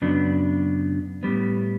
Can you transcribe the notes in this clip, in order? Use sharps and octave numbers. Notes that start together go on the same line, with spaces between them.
F#2 C#3 F#3 B3 D4
A2 G3 B3